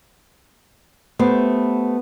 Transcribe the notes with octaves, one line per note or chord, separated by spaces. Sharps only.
A3 B3 G4 C5